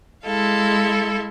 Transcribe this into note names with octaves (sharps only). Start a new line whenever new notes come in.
G#3 E4 A4 F5